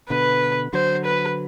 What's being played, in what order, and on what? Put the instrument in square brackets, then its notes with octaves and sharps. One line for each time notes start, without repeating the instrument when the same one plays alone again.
[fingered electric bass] B2 D3 [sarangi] B4
[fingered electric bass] D3 F#3 [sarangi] C5
[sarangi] B4